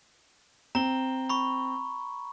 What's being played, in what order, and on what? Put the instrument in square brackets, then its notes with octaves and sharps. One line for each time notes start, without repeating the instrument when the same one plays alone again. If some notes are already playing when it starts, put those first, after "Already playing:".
[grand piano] C4 [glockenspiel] A#5 G7
[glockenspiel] B5 C#6